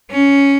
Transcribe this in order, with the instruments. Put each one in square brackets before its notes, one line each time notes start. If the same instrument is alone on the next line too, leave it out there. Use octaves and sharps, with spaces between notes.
[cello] C#4